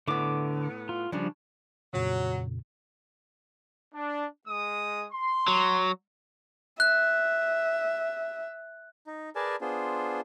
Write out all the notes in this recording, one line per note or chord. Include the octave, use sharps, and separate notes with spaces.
A2 D3 B3 D6
F4
C#3 F3 G3 D4
F2 A#2 C#3 F#3
D4
G#3 D#6
C6
F#3
E5 F#6
D#4
G#4 A#4 B4 D5 G#5 A5
B3 D4 F4 G#4 C5